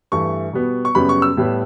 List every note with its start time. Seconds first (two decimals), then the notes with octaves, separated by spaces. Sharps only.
0.12 G2 E3 A3 C#6
0.53 B2 G3 B3
0.85 C#6
0.95 F#2 C#3 G3 B3 B5
1.09 C#6
1.22 E6
1.37 A2 G3 B3